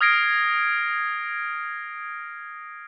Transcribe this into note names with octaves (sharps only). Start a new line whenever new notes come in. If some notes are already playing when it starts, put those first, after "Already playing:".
D#6 F6 G#6 A#6 C7 D7